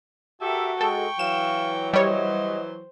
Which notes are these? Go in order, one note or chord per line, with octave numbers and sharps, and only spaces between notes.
F#4 G4 A4 A#4 E5
G#3 A4 G5 C#6
E3 F#3 F5 E7
G3 C5 C#5 D#5